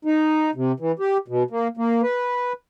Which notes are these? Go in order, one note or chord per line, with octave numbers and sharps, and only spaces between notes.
D#4
C3
E3
G4
B2
A#3
A#3
B4